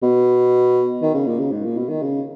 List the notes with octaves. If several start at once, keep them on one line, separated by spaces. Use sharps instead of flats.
B2
D#3
C#3
A#2
C#3
G#2
A#2
B2
D#3
C#3